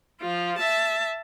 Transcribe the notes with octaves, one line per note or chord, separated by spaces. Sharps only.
F3 F4
E5 A5